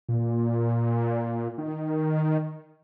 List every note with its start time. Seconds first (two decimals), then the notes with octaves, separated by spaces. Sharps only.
0.09 A#2
1.58 D#3